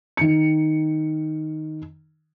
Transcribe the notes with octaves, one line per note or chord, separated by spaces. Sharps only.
D#3 C#7